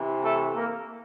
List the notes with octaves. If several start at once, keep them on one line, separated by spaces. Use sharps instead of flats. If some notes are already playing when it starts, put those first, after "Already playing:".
Already playing: C3 E3
A3 A4
A#3 A#4